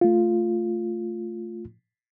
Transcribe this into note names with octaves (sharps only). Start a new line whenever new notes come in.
A3 F4